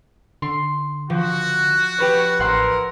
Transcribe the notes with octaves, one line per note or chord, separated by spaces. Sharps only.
D3 C6
F3 F#4
G4 B4 C#5
A1 E4 A#4 C5 F#5 C6